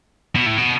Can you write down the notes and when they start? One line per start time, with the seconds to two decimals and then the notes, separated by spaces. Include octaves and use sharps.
0.36 B2
0.46 A2
0.58 B2